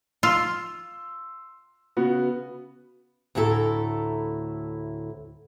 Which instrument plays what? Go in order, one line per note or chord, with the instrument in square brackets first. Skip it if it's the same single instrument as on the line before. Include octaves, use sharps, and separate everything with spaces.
[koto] F4 [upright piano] C6 E6
[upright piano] C#3 B3 F#4
[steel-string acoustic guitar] D2 A2 E4 A4 A#5